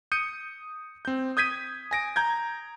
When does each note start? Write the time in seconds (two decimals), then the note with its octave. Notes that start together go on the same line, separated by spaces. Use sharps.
0.12 D#6 G6 C#7 D#7
1.05 C4 G6
1.37 D#6 G6 G#6 B6 D#7
1.91 G#5 A#6 D7
2.16 A#5 G6 G#6